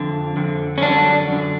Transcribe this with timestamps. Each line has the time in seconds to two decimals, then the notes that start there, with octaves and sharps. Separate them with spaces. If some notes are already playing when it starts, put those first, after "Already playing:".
Already playing: F2 D3
0.36 F2 D3
0.78 C#4
0.82 F#2 D3 D4
1.28 F#2 D3